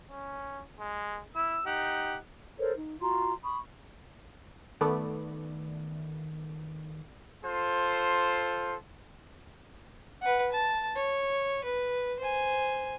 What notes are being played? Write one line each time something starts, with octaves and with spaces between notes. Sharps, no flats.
C#4
G#3
E4 E6
D#4 G4 F#5
A4 A#4 C5 C#5
D#4
F4 F#4 A#5 C6
B5 C#6 D#6
D#3 A3 B3 D5
F4 A4 C5
B4 F#5
A5
C#5
B4
C5 G#5